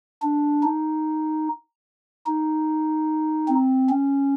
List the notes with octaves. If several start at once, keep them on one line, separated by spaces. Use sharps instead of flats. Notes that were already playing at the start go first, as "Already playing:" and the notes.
D4
D#4
D#4
C4
C#4